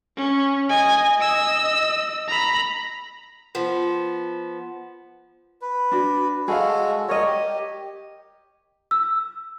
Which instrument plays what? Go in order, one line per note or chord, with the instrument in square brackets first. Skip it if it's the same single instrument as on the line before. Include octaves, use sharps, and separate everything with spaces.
[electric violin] C#4
D#5 G#5
D#5 E6
A#5 B5
[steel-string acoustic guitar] F3 B3
[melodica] B4
[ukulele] D4 F#4
[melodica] G#3 F#4 A4 [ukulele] G#4 F5
[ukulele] A#4 D#5 [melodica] C#5
[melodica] G4
[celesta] E6